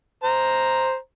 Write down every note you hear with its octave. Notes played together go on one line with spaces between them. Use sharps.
C5 A#5